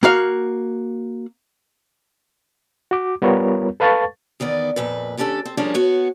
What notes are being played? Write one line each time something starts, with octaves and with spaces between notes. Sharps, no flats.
A#3 F#4 F5
F#4 D6
G3 B3 F4 A#4 C#5
A4 B4 F5 A5 C#6 A6
E2 D#3 B3 D5
F2 A#2 B4
D#2 C#4 D4 G4 A4
C4
F3 G3 A#3 C#4 D4 G#4
B3 F#4 C#5